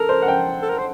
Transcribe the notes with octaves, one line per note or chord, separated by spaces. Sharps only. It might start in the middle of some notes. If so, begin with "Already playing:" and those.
Already playing: A4 A#4
C5
F#5
G5
A4
A#4
C5